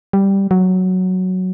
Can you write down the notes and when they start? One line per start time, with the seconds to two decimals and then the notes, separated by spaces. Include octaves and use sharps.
0.13 G3
0.51 F#3